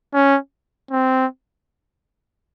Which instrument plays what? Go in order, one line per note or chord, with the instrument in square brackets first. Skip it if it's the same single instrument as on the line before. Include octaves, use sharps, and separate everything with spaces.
[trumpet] C#4
C4